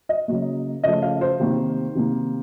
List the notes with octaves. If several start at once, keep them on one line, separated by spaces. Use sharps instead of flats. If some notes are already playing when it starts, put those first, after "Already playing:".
D#5
C#3 F#3 A#3
C#3 F3 A3 D#5
F5
C5
C3 D#3 A#3
C3 D#3 A#3